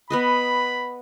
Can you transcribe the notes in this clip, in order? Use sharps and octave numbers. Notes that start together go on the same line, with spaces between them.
B3 B4 D#5 B5